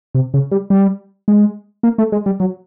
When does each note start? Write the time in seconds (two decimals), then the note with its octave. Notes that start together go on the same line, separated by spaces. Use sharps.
0.15 C3
0.34 C#3
0.52 G3
0.70 G3
1.28 G#3
1.83 A#3
1.98 A3
2.12 G#3
2.26 G3
2.40 F#3